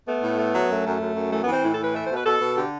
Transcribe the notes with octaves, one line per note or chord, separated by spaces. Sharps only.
A3 B3
A2
A3
F#3
F#2 A3
F#2
F#2
F#2
E3 A3
E3 B3
C4
A2 E4
A4
E3 B4
A3 E5
C5
B2 B4
B2 A4
B2
D3 G4